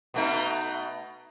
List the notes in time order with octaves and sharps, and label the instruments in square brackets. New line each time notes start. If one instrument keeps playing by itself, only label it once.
[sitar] B2 A3 D#4